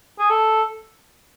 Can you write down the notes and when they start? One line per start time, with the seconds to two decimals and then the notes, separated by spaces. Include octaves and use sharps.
0.19 G#4
0.30 A4